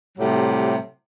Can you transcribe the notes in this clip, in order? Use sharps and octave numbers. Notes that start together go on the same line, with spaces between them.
A2 C3 F#3 G3